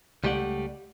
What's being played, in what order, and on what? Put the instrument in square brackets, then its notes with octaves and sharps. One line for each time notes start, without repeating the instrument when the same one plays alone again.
[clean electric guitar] C#2 G3 A3 G4 D5 F#5